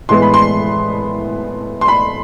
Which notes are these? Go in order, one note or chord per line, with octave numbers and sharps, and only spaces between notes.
A2 E3 G#3 B3 C6
B5
C6
C6
B5